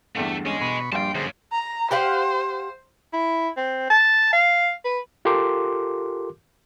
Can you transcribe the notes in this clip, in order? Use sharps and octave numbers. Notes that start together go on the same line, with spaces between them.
E2 G2 D3 A3
G#3 C#4 D#5 G#5
B2 B5 C#6
A#1 G2 G3 F5 G5 A5 C6
F#2 D3 G#4 C5
A#5
G4 C5 F5 F#5
E4
C4
A5
F5
B4
F4 G4 A4 A#4 C6 D6